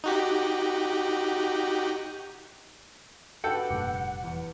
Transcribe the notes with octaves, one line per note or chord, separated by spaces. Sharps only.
D#4 F#4 G4
D4 F#4 G4 A4 B4 F#5 G5
F1 G2 A#2 D6
E2